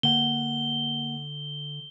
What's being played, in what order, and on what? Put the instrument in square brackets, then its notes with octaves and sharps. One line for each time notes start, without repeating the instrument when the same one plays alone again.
[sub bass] D3 [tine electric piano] A#3 F#5 [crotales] G7